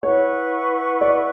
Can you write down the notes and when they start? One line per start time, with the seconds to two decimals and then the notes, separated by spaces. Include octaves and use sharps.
0.03 E4 B4 C#5 F#5 C#6
1.01 D5